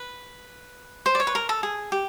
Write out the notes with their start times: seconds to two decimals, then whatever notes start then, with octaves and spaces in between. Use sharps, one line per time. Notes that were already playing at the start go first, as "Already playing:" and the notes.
Already playing: B4
1.06 C5
1.15 D5
1.20 C#5
1.27 B4
1.35 A#4
1.49 A4
1.63 G#4
1.92 G4